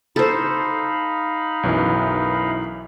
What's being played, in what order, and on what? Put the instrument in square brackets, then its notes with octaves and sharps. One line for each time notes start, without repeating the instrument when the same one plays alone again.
[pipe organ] D#4 F5 B5 [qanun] A4 C5
[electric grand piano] B1 F#2 E3